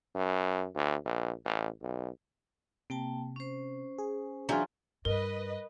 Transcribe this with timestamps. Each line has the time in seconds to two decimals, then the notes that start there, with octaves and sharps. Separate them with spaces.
0.15 F#2
0.75 D2
1.05 A#1
1.45 A1
1.82 B1
2.90 C3 A#3 G5 A5
3.36 C#4 C5
3.98 G#4
4.49 E3 F#3 D4 F4 G#4 G6
5.05 G2 A#4 B4 D#5